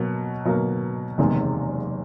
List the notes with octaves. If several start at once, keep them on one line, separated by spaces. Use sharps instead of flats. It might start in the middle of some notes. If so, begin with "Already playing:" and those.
Already playing: B2 F#3 A#3
B2 F#3 A#3
F#1 E2 C3 D#3 G#3